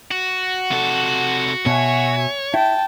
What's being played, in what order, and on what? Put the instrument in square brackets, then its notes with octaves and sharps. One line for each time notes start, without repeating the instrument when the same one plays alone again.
[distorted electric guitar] F#4
[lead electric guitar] C3 A4
[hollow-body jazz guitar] B2 [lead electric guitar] C#5 [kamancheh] E5 G#5
[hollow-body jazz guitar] E4 [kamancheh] G5 A5